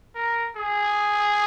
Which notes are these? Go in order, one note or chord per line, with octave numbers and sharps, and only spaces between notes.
A#4
G#4